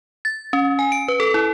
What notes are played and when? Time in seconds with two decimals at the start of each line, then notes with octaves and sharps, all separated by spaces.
0.25 A6
0.53 C#4
0.79 G#5
0.92 D7
1.08 B4
1.20 A4
1.34 E4